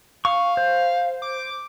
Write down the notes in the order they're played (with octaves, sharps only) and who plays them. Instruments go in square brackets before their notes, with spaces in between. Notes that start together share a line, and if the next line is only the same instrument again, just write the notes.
[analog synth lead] F5 [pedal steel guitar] C#6
[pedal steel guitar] C5
[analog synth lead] D6